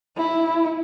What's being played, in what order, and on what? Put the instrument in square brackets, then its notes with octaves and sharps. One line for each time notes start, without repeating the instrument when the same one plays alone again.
[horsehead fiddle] E4